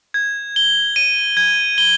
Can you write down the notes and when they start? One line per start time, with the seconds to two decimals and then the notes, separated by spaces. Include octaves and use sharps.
0.14 G#6
0.56 G7
0.96 D#7
1.37 G#6
1.78 G7